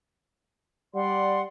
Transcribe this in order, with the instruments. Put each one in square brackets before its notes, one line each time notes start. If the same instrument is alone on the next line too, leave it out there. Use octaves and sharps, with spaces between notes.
[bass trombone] G3 [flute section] D5 F#5 C6